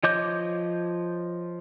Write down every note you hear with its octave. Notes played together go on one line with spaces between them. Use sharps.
F3 C#5 D#5 D6 G6